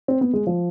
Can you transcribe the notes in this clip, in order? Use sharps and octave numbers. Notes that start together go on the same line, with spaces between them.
C4
B3
G#3
F3